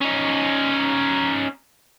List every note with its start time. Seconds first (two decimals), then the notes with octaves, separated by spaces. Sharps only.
0.01 C#4 D#4